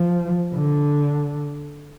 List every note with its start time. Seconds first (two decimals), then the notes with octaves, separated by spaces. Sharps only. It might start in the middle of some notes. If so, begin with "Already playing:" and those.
Already playing: F3
0.54 D3